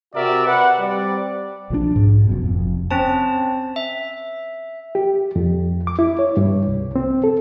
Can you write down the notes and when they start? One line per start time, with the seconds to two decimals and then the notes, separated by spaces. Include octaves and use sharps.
0.15 C3 F#4 A#4 D5 E5
0.46 B4 F#5
0.80 G3 C4 D5
1.70 B1 F3 G3 D4
1.96 G#2
2.27 F1 F#2 B2
2.42 F1 F2
2.91 C4 C#4 C5 A5
3.76 E5
4.95 G4
5.36 F2
5.87 D6
5.99 E4
6.19 C#5
6.37 G2
6.67 C2
6.96 C4
7.24 A4